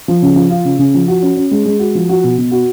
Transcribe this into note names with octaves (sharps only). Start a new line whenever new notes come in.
F3
C#3
F3
F4
C#3
C#3
F3
F#4
C#4
C#4
G#3
G#3
F#4
F3
F#4
B2
B2
F#4